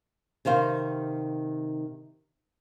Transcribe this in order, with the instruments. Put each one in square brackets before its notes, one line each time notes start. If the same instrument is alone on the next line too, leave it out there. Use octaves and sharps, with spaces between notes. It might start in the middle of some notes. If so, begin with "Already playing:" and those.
[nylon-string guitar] C3 D#3 C5 F5